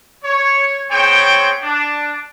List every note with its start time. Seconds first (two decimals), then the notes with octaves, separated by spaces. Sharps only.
0.24 C#5
0.90 B3 C4 G#4 C5 C#5 G5
1.62 D4